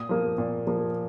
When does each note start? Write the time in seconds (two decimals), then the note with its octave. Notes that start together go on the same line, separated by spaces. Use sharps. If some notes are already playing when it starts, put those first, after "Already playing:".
Already playing: A#2 D#6
0.09 F3 A#3
0.38 A#2
0.67 F3 A#3